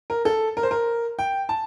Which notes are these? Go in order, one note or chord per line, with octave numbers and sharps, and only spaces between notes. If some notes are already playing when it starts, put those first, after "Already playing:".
A#4
A4
A#4
C5
A#4
G5
A5